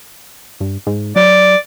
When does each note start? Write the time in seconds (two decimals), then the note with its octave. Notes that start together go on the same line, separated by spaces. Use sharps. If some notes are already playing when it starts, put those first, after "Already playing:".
0.61 G2
0.87 G#2
1.16 F#3 D5